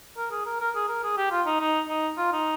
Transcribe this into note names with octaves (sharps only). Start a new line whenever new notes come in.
A#4
G#4
A#4
A#4
G#4
A#4
G#4
G4
F4
D#4
D#4
D#4
F4
D#4